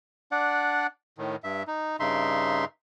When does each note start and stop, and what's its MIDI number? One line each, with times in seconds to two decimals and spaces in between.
0.32 0.87 62
0.32 0.87 74
0.32 0.87 78
1.18 1.36 45
1.18 1.36 51
1.44 1.63 43
1.44 1.63 76
1.67 1.96 63
2.00 2.65 43
2.00 2.65 49
2.00 2.65 63
2.00 2.65 76
2.00 2.65 84